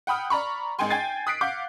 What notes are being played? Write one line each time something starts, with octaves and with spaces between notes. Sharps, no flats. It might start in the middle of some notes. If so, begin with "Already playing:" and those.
F#5 G5 B5 D#6 F6
D5 A#5 B5 C#6
G#1 G#3 G5 G#5 C6
G5 G#5 G#6 A6 C7
D#6 F#6 B6 C7 D7
F5 F#5 D6 G6